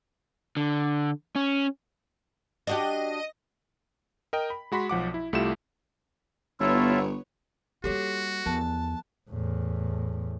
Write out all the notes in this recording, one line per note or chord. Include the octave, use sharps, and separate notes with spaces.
D3
C#4
D4 F#4 G4 D#5
A#4 D#5 G5
B5
G#3 F#4 B5 C6 B6
B1 F3 F#5 D6
E4
C2 A3 E4 F4 G4 E7
G1 B3 E4 F4 A4 C#5
G3 A#3 F#4 G4 A4 C#5
E2 F3 A5 F#6
E2 A2